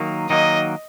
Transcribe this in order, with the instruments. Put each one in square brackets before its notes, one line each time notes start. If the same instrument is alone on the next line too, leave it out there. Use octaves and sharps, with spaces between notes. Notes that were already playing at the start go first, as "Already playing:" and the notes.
Already playing: [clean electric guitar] D#3 F#3 A#3 D#4
[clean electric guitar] D#3 F#3 A#3 D#4 [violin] D#5